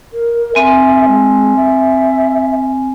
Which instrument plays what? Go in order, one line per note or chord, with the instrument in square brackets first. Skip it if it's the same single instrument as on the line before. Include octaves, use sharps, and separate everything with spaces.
[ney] A#4
[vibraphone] C4 G#5 [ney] E5
[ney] G#3
E5